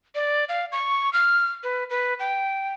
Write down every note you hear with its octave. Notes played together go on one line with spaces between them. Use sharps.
D5
F5
C#6
F6
B4
B4
G5